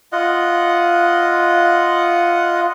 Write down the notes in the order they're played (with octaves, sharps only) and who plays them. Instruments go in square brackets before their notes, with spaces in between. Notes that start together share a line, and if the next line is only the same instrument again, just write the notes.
[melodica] F4 D#5 F#5